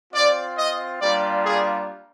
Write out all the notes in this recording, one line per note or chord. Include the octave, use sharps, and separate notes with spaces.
C4 F4 D5
D#5
G3 A#3 D4 F4 D5
G#4